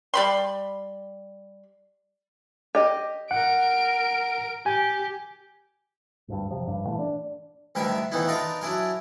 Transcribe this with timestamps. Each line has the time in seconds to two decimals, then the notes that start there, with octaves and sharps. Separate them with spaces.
0.14 G3 B5 C6
2.75 G4 D#5
3.31 A#4 F#5 D7
4.66 G4 G#5
6.28 G#1 D2 G2
6.51 F1 C3 F3
6.67 G1 C#2 G2
6.86 A#2 E3 A3
6.99 D4
7.75 D2 G2 D#3 A#4 B4 E5
8.12 F2 D#3 E3 B3 D#4 E4
8.28 D4 D#4 F4 A#4 B4 A#5
8.61 F#3 D4 E4 G#4 A#4